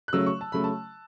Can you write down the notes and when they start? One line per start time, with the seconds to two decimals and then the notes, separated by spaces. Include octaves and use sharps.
0.08 F#6
0.13 C#3 F#3 A3 E6
0.26 C#6
0.41 A5
0.52 C#3 F#3 A3 B5
0.64 A5